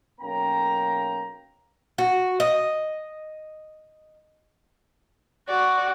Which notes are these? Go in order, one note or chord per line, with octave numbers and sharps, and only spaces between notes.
B1 A#3 C#4 G5 A#5
F#4
D#5
F#4 D5